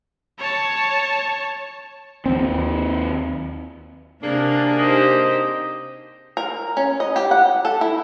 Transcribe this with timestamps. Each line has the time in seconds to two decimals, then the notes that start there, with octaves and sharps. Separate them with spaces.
0.39 C#5 A5
2.26 D#2 C4
4.22 C3 A#3 D4 G#4 A#4
4.79 D#4 G4 C5 D#5
6.37 A#4
6.77 C#4
7.00 D#5
7.16 G4
7.31 F#5
7.65 A4
7.81 E4